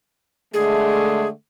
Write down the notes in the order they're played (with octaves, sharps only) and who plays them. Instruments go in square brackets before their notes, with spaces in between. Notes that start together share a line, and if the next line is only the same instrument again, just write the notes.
[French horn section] D3 G#3 A3 [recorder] G#4